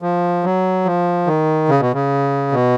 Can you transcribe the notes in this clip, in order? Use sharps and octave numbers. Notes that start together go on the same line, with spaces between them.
F3
F#3
F3
D#3
C#3
B2
C#3
B2